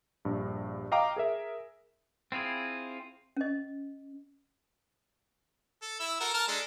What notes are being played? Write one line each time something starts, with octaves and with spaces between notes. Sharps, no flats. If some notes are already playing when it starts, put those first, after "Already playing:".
A#1 G2
D#5 F5 G5 A#5 D6
G#4 A#4 E5
C4 E4 F4 G#4
C#4 D#5
A4
E4 E6
F#4 A4 A#4
A#4 A5 F6
G#3 D4 A4